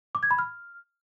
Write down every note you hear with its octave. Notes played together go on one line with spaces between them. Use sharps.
D6
G#6
B5
F6